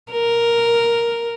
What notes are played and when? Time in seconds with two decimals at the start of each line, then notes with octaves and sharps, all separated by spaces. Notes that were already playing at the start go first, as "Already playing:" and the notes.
0.12 A#4